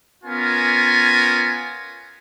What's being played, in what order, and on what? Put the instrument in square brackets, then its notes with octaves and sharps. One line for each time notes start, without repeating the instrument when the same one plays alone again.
[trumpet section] B3 C#4 F4 A#4 G#5